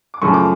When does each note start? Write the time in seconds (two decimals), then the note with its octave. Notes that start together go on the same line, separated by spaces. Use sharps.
0.14 D6
0.21 F#2 C#3 F3 A3 C#6
0.34 D6